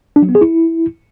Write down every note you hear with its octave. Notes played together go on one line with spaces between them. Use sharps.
D4
F#3
B3
G#4
E4